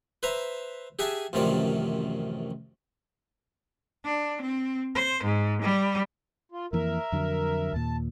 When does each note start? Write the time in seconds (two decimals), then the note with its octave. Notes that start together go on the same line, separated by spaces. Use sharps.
0.23 B4 C5 E5 A#5
0.99 G4 G#4 E5 F#5 G#5 A5
1.33 A1 F#2 C3 D#3 F3 D5
4.04 D4
4.41 C4
4.95 C5
5.23 G#2
5.62 G3
6.52 F4
6.73 F2 E3 A#3 A#4 E5
7.12 F2 D3 F#3
7.73 D#2 A#2 A5